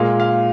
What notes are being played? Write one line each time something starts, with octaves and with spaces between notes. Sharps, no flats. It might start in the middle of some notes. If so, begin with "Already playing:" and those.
Already playing: A#2 G#3 F5
F5